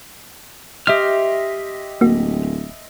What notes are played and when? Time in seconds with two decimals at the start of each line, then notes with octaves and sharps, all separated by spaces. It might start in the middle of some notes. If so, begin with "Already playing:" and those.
0.87 G4 D#5 E5 C6 F6
2.01 D1 A#3 F#4